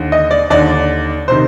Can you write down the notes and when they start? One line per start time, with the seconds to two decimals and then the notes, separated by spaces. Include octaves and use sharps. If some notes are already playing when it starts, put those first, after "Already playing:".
Already playing: D#2 D3
0.12 D#5
0.31 D5
0.50 D#2 D3 D5
1.28 C3 D#3 C5